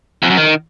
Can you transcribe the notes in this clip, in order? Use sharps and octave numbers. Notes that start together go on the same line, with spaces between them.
F2
F#2
D#3